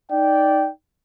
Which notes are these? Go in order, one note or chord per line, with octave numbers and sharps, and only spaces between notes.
D#4 D5 G5